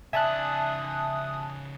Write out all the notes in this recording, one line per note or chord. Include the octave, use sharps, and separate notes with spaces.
C#3 D5 E5 G#5 A5 D#6 F#6